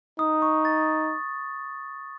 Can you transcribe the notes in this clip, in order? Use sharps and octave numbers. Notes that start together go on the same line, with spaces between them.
D#4 D#6
C#6
A6